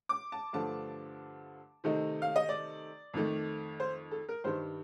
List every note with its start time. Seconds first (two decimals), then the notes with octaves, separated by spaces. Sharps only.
0.09 D6
0.32 A5
0.53 G2 D3 F3 A3 A5
1.84 C3 D#3 A3 D#4
2.22 F5
2.36 D#5
2.49 D5
3.14 F2 D#3 A3
3.80 C5
4.11 A4
4.29 A#4
4.44 G2 D#3 G3 C5